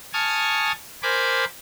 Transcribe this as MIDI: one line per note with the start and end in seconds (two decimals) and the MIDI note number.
0.13 0.72 80
0.13 0.72 81
0.13 0.72 85
0.13 0.72 87
0.13 0.72 89
1.03 1.45 70
1.03 1.45 72
1.03 1.45 80
1.03 1.45 83
1.03 1.45 86